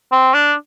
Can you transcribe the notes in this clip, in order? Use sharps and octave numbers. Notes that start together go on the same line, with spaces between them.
C4
D4